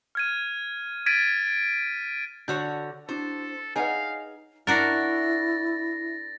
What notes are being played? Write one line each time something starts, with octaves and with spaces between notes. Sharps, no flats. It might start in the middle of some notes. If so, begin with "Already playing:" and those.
F6 G#6 D#7
G#6 A6 B6 D7 D#7
D3 F#4 C#5 G6
D4 E4 F#4 A4 C5
D#4 G#4 B4 C#5 F5 F#5 G#5
D4 E4 F#4 A#4 A6 A#6